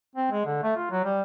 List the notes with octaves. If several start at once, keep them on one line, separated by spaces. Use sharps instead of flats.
C4
G#3
D3
A3
F4
F#3
G3